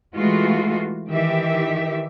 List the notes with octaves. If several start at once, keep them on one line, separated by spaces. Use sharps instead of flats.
E3 G#3 A3 F4 F#4
D#3 E3 G4 E5